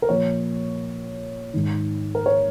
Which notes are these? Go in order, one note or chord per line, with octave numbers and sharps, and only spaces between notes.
A#4
A#2 F3 C#5
G#2 D#3
A#4
C#5